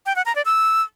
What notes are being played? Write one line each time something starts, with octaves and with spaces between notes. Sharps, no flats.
G5
F#5
A#5
D5
E6